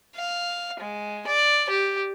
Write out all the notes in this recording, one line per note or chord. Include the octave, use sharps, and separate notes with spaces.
F5
G#3
D5
G4